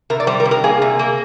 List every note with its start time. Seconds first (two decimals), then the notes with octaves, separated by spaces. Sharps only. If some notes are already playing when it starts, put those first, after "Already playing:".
0.10 C3 A#4
0.20 D5
0.27 G3 C5
0.40 A#4
0.45 C3
0.51 A#4
0.64 A#3 G#4
0.82 C3
0.99 A#3